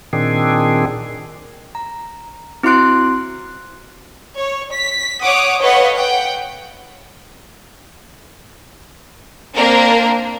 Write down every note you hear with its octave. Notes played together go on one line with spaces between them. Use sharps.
A#2 D#3 C4 D4 G#4
A#5
C4 E4 F#4 C6 F#6 D7
C#5
B6
C#5 F#5 D6 D#6
A4 B4 C#5 D#5 F5 F#5
F#5 G5
A#3 C4 D4 A#4